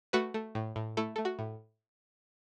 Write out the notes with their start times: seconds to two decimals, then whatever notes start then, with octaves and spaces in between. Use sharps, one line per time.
0.13 A3 F#4 B4
0.34 A3
0.55 A2
0.76 A2
0.97 A3 E4 A4
1.16 A3 A4
1.25 F#4
1.39 A2